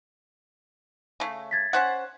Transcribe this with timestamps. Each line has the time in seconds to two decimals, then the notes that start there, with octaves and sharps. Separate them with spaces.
1.20 C#3 A3
1.51 G#6 A6 B6
1.73 C#4 C5 F#5